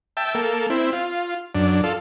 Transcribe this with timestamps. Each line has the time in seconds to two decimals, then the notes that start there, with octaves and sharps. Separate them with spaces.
0.17 E5 G5 A5
0.35 A#3 A4
0.70 C4 E4
0.92 F4
1.55 F#2 D4
1.84 F4 A4